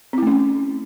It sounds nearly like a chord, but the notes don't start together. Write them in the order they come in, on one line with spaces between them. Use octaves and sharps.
C4 E4 A3 C#4